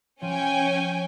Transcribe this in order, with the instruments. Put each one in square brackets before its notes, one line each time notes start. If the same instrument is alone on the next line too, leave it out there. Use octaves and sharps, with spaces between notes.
[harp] F3 [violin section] C#4 G5 G#5